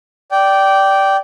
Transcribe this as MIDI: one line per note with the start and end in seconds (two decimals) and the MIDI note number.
0.31 1.16 74
0.31 1.16 79